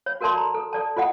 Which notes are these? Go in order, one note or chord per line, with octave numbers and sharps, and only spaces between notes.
C#5
F#4 A4 A#4 D5 A5 C6
A#5
A4
A4 D5 A5
F4 A4 D#5 F#5